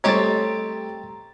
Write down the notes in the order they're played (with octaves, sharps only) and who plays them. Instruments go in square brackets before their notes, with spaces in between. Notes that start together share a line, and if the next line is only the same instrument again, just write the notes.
[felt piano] G3 A3 D#5 [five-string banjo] C4 G4 C#5 [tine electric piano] A#5 A6